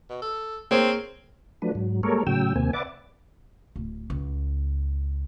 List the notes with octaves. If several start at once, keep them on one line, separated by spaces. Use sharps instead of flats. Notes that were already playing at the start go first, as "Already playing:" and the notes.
B2
A4
A#3 C4 G#4 C#5
F3 F#3 A3 D4 B4
G#2 F#3
G3 G#3 A#3 A4 A#4 C#5
A2 C#3 F#3 G5 E6
D#2 C3 A#3 C4 G#5
B4 D5 E5 F#5 D6 A6
D1
C#2